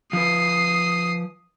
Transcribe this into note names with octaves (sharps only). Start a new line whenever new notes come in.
F3 B4 D#6 C7